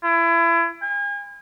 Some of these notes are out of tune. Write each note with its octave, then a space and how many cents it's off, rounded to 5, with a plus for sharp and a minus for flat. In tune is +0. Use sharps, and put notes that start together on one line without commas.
E4 +30
G#5 -40